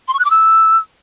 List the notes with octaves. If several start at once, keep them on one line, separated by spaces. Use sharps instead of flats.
C6
C#6
F#6
D6
E6